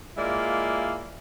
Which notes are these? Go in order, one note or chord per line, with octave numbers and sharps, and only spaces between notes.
G#3 A#3 E4 F4 D5